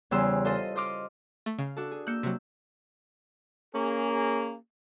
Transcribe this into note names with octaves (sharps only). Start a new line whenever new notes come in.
E2 C#3 G3 C5 E6
F4 A4 C5 D#5 D#6
C5 D#5 D6 F6
A3
C#3 F5
D4 F#4 A4
G#4
A#3 E6 F#6 G6 C#7
C3 F#3
A#3 C#4 G#4